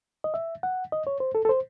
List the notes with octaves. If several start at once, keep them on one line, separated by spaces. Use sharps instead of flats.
D#5
E5
F#5
D#5
C#5
C5
A4
A4
C5